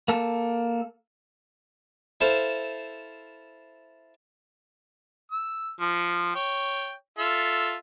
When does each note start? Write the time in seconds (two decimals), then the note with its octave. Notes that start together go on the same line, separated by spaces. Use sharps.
0.08 A#3 A4
2.21 E4 A4 C5 F5
5.32 E6
5.80 F3
6.35 C#5 G5
7.19 F4 A4 E5